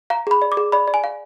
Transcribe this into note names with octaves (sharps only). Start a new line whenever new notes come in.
F5 A#5
G#4 B5
D5
D6
G#4
D5 B5
D5
G#5
F5